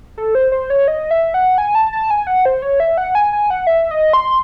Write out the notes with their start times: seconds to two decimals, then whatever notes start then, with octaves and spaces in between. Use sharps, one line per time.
0.18 A4
0.35 C5
0.52 C5
0.70 C#5
0.88 D#5
1.11 E5
1.34 F#5
1.58 G#5
1.75 A5
1.93 A5
2.11 G#5
2.27 F#5
2.46 C5
2.62 C#5
2.80 E5
2.98 F#5
3.15 G#5
3.33 G#5
3.50 F#5
3.67 E5
3.91 D#5
4.13 C6